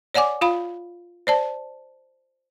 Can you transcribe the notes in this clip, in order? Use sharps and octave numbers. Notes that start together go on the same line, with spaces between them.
C#5 D5 F#5 G#5 D6
F4 F5 B5
C5 D5 A5